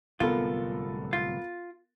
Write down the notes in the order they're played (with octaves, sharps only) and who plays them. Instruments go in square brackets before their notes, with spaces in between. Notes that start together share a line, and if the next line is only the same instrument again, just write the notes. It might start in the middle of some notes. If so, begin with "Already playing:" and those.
[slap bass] D1 C2 C3 [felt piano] B3 A4 A#4 [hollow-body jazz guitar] F4
[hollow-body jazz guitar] F4